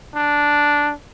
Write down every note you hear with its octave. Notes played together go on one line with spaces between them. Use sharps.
D4